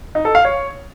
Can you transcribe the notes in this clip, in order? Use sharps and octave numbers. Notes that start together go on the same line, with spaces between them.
D#4
A4
F5
C#5